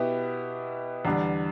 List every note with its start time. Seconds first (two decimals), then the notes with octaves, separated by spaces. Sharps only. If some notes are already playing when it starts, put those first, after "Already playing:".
Already playing: B2 B3 E4 G4
1.05 E2 D3 G3 D4